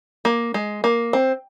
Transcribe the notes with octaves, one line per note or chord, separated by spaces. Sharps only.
A#3
G#3
A#3
C4